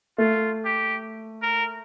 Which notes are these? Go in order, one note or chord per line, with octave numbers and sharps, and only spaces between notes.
A3 F4
G4
A#4